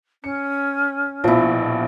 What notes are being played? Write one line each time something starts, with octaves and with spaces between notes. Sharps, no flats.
C#4 C#7
A#1 B2 F3 E4